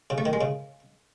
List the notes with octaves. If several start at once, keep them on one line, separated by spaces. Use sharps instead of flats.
C#3
A3
D#3
G#3
C#3